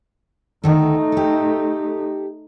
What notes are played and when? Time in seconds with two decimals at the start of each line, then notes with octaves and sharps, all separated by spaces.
0.64 D2 D#3 A3 D#4 A4
1.12 G4 A4